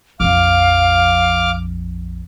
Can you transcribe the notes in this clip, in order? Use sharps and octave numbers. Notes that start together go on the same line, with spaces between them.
A#1 F2 F5 D6 F6